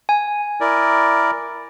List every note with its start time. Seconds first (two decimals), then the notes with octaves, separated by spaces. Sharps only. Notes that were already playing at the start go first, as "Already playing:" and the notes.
0.09 G#5
0.61 E4 A#4 D5